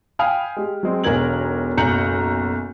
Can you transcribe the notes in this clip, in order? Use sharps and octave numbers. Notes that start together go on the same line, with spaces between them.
F5 G5 G#5 B5 D#6 F6
G#3 G4
F#3 G#3 C4
E1 B1 G#3 A#4 G#6 F#7
F#1 B1 A#5 G6 C#7 F#7